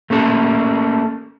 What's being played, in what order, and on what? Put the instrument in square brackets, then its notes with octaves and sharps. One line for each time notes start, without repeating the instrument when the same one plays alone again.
[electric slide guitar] A3 A#3 C#4 A4